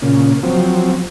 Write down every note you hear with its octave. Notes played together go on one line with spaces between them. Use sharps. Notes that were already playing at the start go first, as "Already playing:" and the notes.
A#2 C#3
F3 F#3 C4